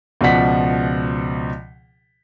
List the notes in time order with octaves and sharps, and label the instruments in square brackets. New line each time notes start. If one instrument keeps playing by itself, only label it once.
[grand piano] C#2 B2 F3 D5 F#5 B6